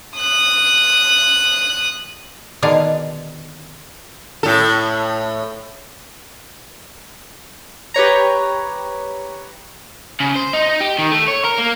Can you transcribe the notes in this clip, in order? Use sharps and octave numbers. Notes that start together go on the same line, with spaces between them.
D#6 F#6
B2 D3 D#3 D4 G#4 F5
A2 A4
G4 B4 C#5 A#5
C#3
C5
D#4
G4
D#3
A3
C#5
A#4
A#3